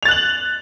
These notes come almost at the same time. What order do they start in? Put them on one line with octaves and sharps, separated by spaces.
F7 A6 F#6 F#7